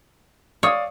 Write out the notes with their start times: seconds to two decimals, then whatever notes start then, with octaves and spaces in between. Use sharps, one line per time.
0.63 C#5 D5 F5 D#6